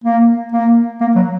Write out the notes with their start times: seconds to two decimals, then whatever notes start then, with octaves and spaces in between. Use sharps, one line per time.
0.04 A#3
0.52 A#3
1.00 A#3
1.16 F#3